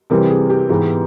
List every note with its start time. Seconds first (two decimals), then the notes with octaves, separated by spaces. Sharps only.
0.10 C3 E3 G3 C4 A#4
0.30 G#4
0.50 G4
0.69 G#2 E3 G#3 B3